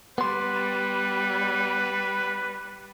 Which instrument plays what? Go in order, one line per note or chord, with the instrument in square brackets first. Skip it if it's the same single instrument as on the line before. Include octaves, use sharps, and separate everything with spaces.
[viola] G3 [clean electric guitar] B3 C6 [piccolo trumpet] B4